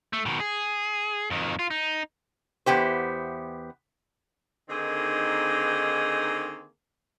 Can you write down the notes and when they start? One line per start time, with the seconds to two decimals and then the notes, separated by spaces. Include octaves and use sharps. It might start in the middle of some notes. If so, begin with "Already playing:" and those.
0.13 A3
0.26 B2 D#3
0.40 G#4
1.30 F2 D#3
1.59 F4
1.71 D#4
2.66 E2 B3 G4 C5
4.69 D3 D#3 A#3 C4 D#4 G#4